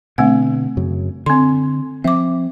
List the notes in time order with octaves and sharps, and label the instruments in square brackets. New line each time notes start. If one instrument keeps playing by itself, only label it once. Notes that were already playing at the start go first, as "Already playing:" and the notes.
[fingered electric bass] B2 D3 [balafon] A3 C4 F#5
[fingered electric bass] F#2 C#3
[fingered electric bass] D3 [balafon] C4 C6
[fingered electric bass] F3 C4 [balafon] E5 D6